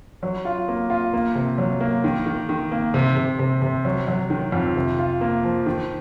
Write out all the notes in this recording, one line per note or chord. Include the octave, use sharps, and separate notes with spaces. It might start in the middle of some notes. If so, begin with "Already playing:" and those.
F#3
F4
A#3
F4
A#3
C3
F#3
A#3
D#3
D#3
D#3
A#3
C3
C3
C3
C3
F#3
F#3
D#3
F2
C3
F4
A#3
F3
D#3